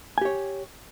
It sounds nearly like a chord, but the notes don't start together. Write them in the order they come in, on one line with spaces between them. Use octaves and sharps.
G#5 G4 C#5